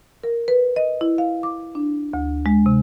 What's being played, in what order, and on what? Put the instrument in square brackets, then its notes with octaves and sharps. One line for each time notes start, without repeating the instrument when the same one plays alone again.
[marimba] A#4
B4
D#5
E4
F5
D6
D4
D2
G#3
C3